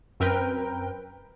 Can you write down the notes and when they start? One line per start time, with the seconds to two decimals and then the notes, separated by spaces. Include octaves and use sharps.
0.20 F#2 C4 A#4 B4 G5